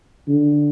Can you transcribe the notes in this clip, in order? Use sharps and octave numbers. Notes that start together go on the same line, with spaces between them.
D3